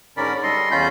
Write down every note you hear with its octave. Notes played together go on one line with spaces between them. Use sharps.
G#2 D3 C#4 A#4 D5 B5
G3 A4 D#5 C6
E2 C#4 F4 B5 G6